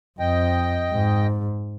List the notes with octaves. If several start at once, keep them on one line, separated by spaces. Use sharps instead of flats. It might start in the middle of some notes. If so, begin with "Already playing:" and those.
F2 D#5 G5
G#2